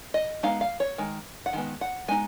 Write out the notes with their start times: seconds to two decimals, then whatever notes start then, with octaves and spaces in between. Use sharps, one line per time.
0.14 D#5
0.43 G#3 B3 D#4 F5
0.61 F5
0.80 C#5
0.98 D#3 G#3
1.46 F#5
1.53 D#3 G#3 B3
1.81 F#5
2.08 G#3 B3 D#4 G#5